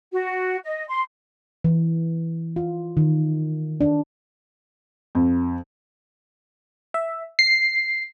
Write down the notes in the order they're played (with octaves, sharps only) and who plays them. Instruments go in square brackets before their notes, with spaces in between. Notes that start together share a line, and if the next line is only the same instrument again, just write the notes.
[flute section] F#4
D#5
C6
[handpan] E3
F4
D#3
D4
[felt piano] F2
[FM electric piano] E5
C7